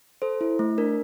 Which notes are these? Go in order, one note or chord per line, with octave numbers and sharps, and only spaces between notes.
A4 C5
E4
A3
D4 A#4